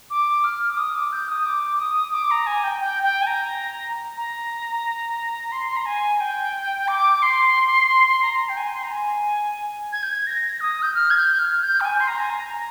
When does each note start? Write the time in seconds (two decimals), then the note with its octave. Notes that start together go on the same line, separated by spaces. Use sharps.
0.10 D6
0.44 F6
0.70 D6
0.77 D#6
0.95 D6
1.12 G6
1.29 D#6
1.46 D6
1.79 D#6
2.14 D6
2.31 A#5
2.47 G#5
2.64 G5
2.81 G5
3.03 G5
3.22 G#5
3.27 A#5
4.17 A#5
5.52 C6
5.77 A#5
5.86 G#5
6.21 G5
6.88 D6
7.22 C6
8.23 A#5
8.49 G5
8.57 G#5
8.74 C6
8.84 A#5
8.91 G#5
9.93 G#6
10.03 G6
10.10 G#6
10.27 A#6
10.60 D#6
10.82 G6
10.95 F6
11.10 G#6
11.18 G6
11.39 F6
11.63 G6
11.80 G5
11.85 G#5
12.00 C6
12.08 A#5
12.20 G#5
12.30 A#5